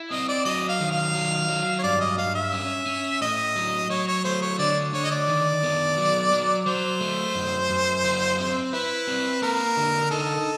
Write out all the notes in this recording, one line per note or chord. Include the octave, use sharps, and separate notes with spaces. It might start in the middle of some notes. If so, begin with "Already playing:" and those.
Already playing: E4
C4 D#5
D5
F#3 D#5
F5
D#3
F5
F#3
F#3
C#5
G2 D5
D#5
G2 F5
E5
C#4
C#4
A2 D#5
F#3
F#3 C#5
C#5
A3 C5
C#5
D3 D5
D3 C#5
D#5
D5
D#3
B3
F#3
F#3
F#3 C5
A3
F#2
F#2
E4
C4
E4 B4
C4
A#3 A#4
D3
D#4 A4